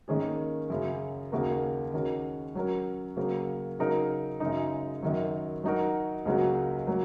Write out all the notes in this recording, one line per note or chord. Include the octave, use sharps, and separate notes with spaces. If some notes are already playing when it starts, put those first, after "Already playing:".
G#2 D#3 A#3 C#4 G#4
F#2 C#3 F#3
D#2 C#3 A#3 F#4 A#4
D#3 G#3 C#4 F#4 A#4
F#3 C#4 A#4
C#3 F#3 A#3
C#3 F#3 D#4 A#4
F#2 C#3 G#3 D#4
F#2 D#3 F#3
F#3 D#4 F#4 A#4
C#2 C#3 F#3 A#3 F#4
F#3 A#3